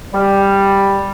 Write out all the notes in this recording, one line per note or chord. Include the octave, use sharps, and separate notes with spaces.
G3